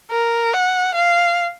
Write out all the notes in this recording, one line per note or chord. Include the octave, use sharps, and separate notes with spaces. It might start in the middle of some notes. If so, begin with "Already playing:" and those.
A#4
F#5
F5